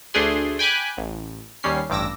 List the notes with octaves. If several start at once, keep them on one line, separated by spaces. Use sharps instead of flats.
D2 A3 D4 G#4 C6
G5 G#5 B5 D6 F#6
A1
D#2 G3 C#4 C7
A1 G2 D6 E6 A#6